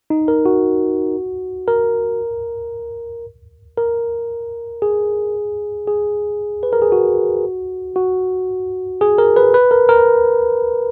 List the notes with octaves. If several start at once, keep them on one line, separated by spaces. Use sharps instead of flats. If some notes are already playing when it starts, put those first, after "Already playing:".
D#4
A#4
F#4
A#4
A#4
G#4
G#4
B4
A#4
G#4
F#4
F#4
G#4
A#4
B4
B4
A#4
A#4